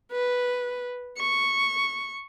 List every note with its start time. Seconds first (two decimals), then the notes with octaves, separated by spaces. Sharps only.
0.12 B4
1.19 C#6